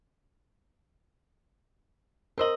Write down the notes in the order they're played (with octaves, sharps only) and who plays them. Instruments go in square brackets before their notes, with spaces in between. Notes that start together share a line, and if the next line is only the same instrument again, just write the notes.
[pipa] C4 C5 D#5 [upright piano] A#4 E6 F#7